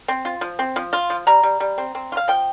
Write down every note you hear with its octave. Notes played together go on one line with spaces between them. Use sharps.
C4
F4
F3
C4
F3
F4
F3
G3 A#5
G3
G3
C4
C4
F4
F5
F3 G5